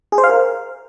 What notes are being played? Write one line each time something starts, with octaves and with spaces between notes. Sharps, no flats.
G#4
C5
F5
A#4